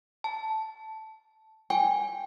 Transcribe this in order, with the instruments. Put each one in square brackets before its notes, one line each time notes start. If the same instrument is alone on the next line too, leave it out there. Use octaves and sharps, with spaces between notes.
[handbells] A5
[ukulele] G5 [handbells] G#5